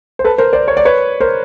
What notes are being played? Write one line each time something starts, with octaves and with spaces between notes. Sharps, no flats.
C5
A4 B4
A#4 C5
C5 D5
C#5
D5
B4 C#5
A#4 C5